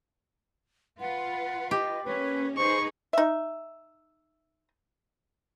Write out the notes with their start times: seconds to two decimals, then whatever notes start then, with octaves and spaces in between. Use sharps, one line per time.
1.00 F4 B4 F#5
1.71 G4 D#5
2.05 A#3 C#4 B4
2.57 D#4 G#4 B4 C5 C#6
3.13 D#4 E5